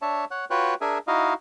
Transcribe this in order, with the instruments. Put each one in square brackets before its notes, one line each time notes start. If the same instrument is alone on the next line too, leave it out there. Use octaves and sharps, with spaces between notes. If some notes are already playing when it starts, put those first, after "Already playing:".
[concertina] D4 C#5 E5 A5
C#5 F#5 F#6
F4 F#4 B4 C#5 G5 F#6
D4 G#4 A#4 E5 G#5
D#4 E4 F#4 D#5 F5